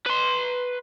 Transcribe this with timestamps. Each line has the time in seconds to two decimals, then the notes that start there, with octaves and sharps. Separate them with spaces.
0.06 B4 C6